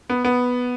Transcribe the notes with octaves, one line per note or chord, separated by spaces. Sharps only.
B3
B3